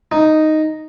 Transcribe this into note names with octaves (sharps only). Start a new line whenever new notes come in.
D#4